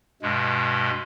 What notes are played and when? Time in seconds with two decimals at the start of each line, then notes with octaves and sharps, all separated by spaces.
0.22 G2 B2 G#3